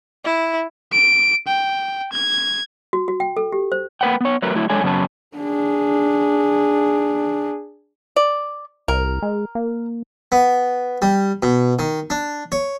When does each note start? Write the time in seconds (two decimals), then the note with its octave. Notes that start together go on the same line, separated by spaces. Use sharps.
0.24 E4
0.92 D7
1.48 G5
2.12 G#6
2.93 F#4
3.08 F#4
3.20 G5
3.37 A4
3.52 G4
3.72 C5
4.01 A#3 A#4 B4 F#5 G5
4.21 B3 C#5
4.42 F#3 A3 A#4 B4
4.55 F#3 A3 E4
4.70 G#3 D4 A4 C#5 G#5
4.83 F#2 C#3 F#3 B3 C#4 A5
5.37 D4 G#4
8.16 D5
8.88 C2 A#4
9.22 G#3
9.55 A#3
10.32 B3
11.02 G3
11.43 B2
11.79 D#3
12.10 D4
12.52 C#5